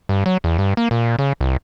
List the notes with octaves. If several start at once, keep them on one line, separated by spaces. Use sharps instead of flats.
G2
F#3
E2
G2
A#3
A#2
C#3
C2